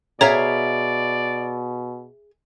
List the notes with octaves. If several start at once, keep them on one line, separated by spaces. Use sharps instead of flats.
B2 G#4 C#5 D5 E5 F5 A#5